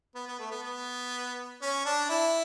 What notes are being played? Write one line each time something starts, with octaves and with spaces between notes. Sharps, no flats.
B3
B3
A3
B3
B3
C#4
D4
E4